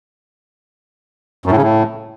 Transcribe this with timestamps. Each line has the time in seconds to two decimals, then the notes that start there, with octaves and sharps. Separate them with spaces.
1.46 F#2
1.51 A2
1.57 C#3
1.62 A2